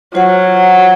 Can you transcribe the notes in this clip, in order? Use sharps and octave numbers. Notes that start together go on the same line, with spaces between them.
F#3 F4 C5 F#5